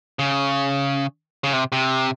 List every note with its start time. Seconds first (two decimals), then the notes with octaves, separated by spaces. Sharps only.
0.19 C#3
1.44 C#3
1.53 C3
1.72 C3